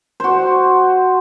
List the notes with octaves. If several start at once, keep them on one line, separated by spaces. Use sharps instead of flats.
F#4 C5